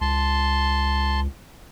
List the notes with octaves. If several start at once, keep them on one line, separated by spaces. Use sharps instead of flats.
C#2 A5 C6